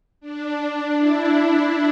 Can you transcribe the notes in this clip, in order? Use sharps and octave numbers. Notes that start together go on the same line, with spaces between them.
D4
E4